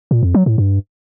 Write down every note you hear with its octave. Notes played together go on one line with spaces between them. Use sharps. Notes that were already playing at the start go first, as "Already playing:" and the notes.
A#2
F2
F#3
A2
G2